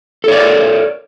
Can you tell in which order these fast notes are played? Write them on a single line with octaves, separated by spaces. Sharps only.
A4 C#5 D5 A#4